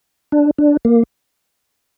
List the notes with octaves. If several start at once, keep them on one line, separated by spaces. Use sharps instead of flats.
D4
D4
A#3